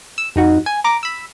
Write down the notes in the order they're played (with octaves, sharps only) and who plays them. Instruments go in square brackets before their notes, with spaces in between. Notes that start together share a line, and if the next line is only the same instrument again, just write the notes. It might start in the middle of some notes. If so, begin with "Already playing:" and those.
[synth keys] E6
F2 D#4 F#4
G#5
A#5 D6
B5 E6